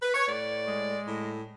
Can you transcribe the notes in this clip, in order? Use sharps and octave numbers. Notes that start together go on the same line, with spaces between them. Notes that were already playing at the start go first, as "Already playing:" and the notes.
B4
C#5
A2 D5
G#3
A2